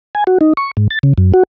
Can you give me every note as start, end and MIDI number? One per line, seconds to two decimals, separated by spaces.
0.15 0.24 80
0.27 0.38 66
0.41 0.53 63
0.57 0.71 85
0.77 0.88 44
0.90 0.99 93
1.03 1.14 49
1.18 1.32 42
1.34 1.43 66